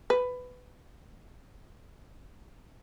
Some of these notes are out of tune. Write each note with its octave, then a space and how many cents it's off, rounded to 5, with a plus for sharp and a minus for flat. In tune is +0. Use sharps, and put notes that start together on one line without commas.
B4 +15